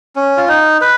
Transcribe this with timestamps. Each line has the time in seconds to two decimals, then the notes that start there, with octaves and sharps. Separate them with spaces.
0.16 C#4
0.37 F4
0.48 D#4
0.81 B4